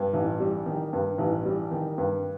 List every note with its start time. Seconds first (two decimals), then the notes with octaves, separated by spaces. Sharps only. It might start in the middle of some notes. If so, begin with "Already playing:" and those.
Already playing: G2
0.13 A1
0.40 G3
0.66 D#3
0.93 G2
1.18 A1
1.46 G3
1.71 D#3
1.98 G2